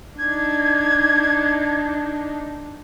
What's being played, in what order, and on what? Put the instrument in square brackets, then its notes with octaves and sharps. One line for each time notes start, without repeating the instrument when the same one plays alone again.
[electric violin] D4 D#4 [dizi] G#6